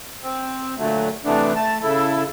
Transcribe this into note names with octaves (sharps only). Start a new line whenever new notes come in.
C4
A#2 D3 F#3 A3
C3 E3 A3 B3 D4
A3 A5
C#3 E4 A4